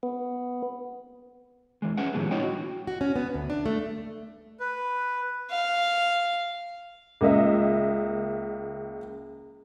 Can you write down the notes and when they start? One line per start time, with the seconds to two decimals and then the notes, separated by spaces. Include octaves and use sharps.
0.03 B3
1.82 E2 E3 G#3
1.97 C#4 G#4 B4 E5 F#5
2.14 A2 D#3 F3 G3 G#3 B3
2.31 B3 D4 E4 C#5 D#5 G5
2.43 F#4
2.87 F#4
3.01 C#4
3.16 B3
3.34 D2
3.50 D4
3.66 A3
4.60 B4
5.51 F5
7.21 C#2 A#3 D#5 E5